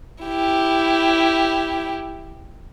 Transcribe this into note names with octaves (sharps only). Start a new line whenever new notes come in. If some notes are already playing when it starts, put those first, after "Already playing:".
E4 G4